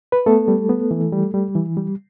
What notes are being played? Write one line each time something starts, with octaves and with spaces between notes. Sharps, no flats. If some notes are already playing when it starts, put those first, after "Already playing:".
B4
A3 B3 A4
G3
B3
E3
G3
G3
E3
G3